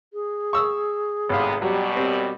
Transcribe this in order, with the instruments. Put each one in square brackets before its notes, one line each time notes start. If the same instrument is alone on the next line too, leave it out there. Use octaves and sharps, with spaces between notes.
[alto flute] G#4
[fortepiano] C#6 E6
[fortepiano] G#1 F5 [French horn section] A2 C3 B3
[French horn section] F#2 B2 G3 [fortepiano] F#3 [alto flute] G4
[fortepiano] C4 [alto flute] G4